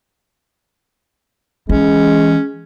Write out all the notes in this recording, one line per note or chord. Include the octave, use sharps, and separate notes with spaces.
E3 G#3 C#4